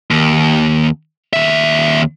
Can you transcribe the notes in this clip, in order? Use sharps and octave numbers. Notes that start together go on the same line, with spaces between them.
D#2
D#2 E5